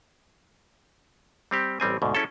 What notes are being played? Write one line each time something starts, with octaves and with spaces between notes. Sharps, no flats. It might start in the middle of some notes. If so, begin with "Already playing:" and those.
G3 C4 G4
A1 G3 C4 G#5
D2 G#2 B2
F#3 C#4 E4 G#4 A4